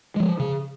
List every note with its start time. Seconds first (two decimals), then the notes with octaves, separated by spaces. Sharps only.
0.16 F3 G#3
0.39 C#3